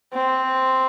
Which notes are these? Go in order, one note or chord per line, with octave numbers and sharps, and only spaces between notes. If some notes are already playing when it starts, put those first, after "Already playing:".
C4